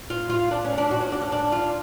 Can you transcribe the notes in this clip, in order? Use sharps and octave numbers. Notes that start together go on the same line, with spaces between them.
F4
F4
D4
C#4
D4
F#4
C#4
D4
C#4
D4
F4